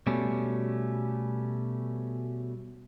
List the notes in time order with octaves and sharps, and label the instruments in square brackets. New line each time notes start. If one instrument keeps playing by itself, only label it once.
[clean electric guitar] B2 G3 A3 C#4